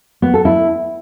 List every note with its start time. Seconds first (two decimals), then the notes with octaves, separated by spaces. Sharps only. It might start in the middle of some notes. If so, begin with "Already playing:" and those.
0.22 B3
0.34 A4
0.45 E4